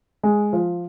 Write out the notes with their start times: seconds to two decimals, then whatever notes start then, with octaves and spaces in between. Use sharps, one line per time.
0.23 G#3
0.53 F3